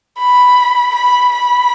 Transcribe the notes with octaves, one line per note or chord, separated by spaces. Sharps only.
B5
B5
B5